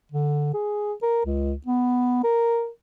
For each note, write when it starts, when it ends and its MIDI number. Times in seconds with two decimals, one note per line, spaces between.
0.12 0.53 50
0.54 0.93 68
1.02 1.23 70
1.26 1.54 37
1.66 2.22 59
2.24 2.68 70